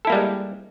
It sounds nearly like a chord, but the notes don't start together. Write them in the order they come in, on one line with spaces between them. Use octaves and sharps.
A4 E4 A#3 G3 G#3